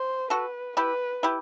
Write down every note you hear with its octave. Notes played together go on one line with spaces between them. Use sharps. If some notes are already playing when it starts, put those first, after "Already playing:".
Already playing: C5
F#4 A4 B4
E4 G4 B4
E4 G4